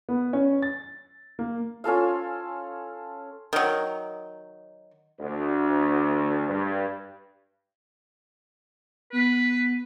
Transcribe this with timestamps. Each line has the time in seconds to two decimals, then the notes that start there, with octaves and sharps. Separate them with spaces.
0.09 B3
0.33 C#4
0.62 A6
1.39 A#3
1.84 C#4 F4 A4 F5
3.53 D#3 F#3
5.20 D2
6.49 G2
9.13 B3 B4